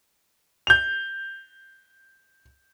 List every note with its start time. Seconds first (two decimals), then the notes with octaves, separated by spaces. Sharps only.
0.67 G6 F7